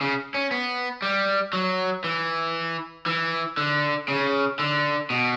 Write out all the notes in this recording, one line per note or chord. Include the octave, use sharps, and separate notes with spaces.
C#3
C#4
B3
G3
F#3
E3
E3
D3
C#3
D3
B2